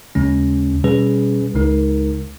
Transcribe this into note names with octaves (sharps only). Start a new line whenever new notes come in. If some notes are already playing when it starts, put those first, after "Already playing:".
D#2 C#3 G#3 C#4
B2 G3 C#4 G#4 B4
C#2 C#3 G#3 D#4 A#4